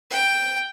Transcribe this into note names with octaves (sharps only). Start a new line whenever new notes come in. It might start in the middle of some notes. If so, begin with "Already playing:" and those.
G5